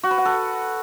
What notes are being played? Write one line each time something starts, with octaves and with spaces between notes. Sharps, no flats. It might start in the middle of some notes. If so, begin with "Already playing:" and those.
F#4
B4
F#5
A4